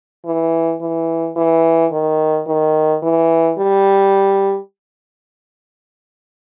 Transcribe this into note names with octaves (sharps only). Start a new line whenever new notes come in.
E3
E3
E3
D#3
D#3
E3
G3